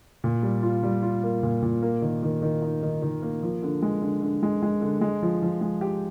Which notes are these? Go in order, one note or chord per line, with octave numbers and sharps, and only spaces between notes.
A#2
G3
F4
G3
F4
A#3
A#2
A#2
A#3
D#3
D#3
D#3
D#4
D#3
D#3
A#3
F3
D3
G#3
D3
D3
G#3
G#3
D3
G#3
F3
F3
G#3
G4